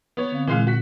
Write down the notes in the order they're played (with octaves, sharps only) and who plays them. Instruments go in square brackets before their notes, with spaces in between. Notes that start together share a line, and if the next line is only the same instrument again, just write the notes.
[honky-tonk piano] B3 C#5
[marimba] D3 C4 F5
[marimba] A#2 [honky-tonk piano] E3 G#3 F5
[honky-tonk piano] F#4 B6